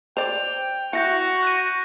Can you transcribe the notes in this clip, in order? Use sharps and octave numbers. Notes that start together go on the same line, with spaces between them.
C5 D5 G5 F7
E4 F#4 G6 A#6 C#7
F#6 A#6 D#7